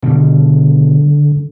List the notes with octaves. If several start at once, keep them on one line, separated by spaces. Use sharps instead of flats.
B2 D3 G3